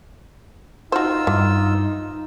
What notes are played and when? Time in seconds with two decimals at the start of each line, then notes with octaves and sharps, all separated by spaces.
0.92 D#4 F4 F#4 C5 E6
1.27 G2 E3